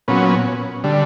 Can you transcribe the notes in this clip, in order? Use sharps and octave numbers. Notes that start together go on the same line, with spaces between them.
A#2 F#3 B3 C#4
D3 G3